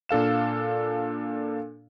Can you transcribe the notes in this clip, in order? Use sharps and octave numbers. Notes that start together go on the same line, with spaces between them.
A#2 D4 A4 F5 E7